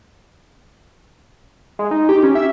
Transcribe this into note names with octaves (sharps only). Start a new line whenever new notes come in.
G#3
D#4
G4
C#4
E5